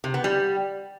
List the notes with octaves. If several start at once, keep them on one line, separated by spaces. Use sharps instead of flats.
C3
B3
G3